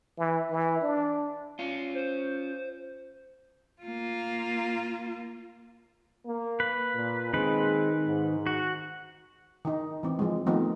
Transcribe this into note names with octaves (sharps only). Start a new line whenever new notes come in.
E3
E3
D4
C#4 F4
C5
A#3 F4
A#3
B4
A#2
D#3 G#3 C4 B4
G#2
F#4
D#3 D#4
E3 C4
F3 G#3
D#3 F3 A3 B3 C4 D#4